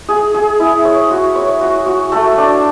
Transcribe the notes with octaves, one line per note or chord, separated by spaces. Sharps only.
G#4
G#4
E4
C#5
F#4
C#5
F#4
F#4
A3
D4